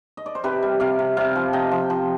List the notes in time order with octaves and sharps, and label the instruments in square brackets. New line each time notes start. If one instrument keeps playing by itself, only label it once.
[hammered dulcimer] D#5
D5
C5
C3 G4 B4
G3
C3 D5 F5
C3
C3 D5 F5
F3
C3 D#5 G5
F3
F3